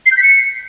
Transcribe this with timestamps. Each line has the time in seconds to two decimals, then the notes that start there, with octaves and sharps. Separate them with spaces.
0.06 C7
0.11 G6
0.17 B6
0.23 C#7